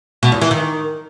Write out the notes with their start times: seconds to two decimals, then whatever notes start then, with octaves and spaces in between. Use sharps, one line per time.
0.23 B2
0.32 E2
0.41 E3
0.51 D#3